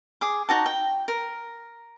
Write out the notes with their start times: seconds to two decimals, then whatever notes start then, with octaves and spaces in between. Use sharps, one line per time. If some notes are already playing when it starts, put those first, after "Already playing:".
0.21 G#4 D6
0.49 D#4 F#4 A5
0.66 G5
1.08 A#4